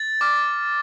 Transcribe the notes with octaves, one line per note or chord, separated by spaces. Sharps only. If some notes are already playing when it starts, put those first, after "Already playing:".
Already playing: A6
D6 F6